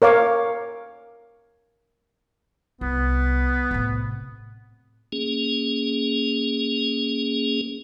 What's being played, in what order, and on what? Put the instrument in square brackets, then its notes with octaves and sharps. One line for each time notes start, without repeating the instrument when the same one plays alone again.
[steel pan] A#4 C#5 F5 D6
[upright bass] C2 [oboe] B3
[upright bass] A2 C3
[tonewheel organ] A#3 C#4 G#4